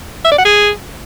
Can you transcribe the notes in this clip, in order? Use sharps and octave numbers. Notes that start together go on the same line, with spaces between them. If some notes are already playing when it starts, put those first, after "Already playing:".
E5
D5
F#5
G#4